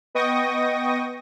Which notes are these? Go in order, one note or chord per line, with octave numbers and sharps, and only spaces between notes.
B3 D#5 G5 C#6 D#6 A#6